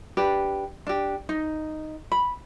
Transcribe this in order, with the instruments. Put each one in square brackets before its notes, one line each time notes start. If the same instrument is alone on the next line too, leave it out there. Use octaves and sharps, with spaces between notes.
[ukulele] D4 G4 B4
D4 G4
D#4
B5